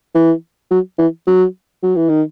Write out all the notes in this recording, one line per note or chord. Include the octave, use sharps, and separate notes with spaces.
E3
F#3
E3
F#3
F#3
E3
D#3